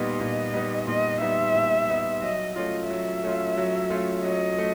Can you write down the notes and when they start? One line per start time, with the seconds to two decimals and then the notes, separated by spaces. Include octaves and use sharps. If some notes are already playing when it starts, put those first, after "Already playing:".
Already playing: A#2 G3 B3 D#4 D#5
0.21 A#2
0.54 G3 B3 D#4
0.87 A#2 D#5
1.21 G3 B3 D#4 E5
1.55 A#2
1.89 G3 B3 D#4
2.22 F#3 D#5
2.56 A3 C#4 F4 D#5
2.90 F#3 E5
3.23 A3 C#4 F4
3.57 F#3
3.90 A3 C#4 F4
4.24 F#3 D#5
4.58 A3